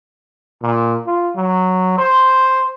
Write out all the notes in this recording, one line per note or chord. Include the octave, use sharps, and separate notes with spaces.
A#2
F4
F#3
C5